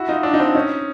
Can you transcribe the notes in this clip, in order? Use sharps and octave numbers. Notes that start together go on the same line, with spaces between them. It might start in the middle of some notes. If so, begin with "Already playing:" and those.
Already playing: E4 F#4
D#4 F4
D4 E4
D#4
C4 D4
C#4 D#4